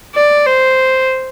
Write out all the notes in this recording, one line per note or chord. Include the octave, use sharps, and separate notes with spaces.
D5
C5